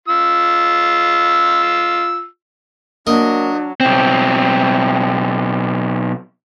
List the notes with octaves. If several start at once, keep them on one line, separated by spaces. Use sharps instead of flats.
F4 E6
F#3 A#3 D4 A#4 D#5
B1 C4